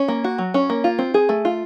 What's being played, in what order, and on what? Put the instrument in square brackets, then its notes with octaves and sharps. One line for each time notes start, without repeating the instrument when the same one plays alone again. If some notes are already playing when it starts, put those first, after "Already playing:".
Already playing: [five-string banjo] C#4
A#3
F#4
F#3
C#4
A#3
F4
C4
G#4
A3
F4